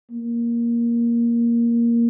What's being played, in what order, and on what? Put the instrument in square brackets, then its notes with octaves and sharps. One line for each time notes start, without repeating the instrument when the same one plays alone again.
[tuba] A#3